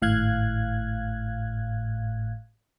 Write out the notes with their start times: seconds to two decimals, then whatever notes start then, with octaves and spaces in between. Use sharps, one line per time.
0.02 G#1 A2 F5 F#6 G#6